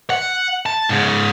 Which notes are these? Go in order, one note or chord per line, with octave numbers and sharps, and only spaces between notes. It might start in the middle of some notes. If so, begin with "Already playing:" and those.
F#5
A5
G#2 C#3